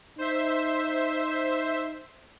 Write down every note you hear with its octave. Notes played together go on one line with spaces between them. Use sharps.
D#4 C5 E5